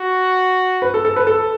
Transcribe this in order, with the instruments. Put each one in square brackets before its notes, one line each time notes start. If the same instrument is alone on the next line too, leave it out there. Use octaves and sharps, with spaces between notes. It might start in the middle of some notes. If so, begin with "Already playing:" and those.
Already playing: [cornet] F#4
[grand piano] B4
A4
A4
B4
A4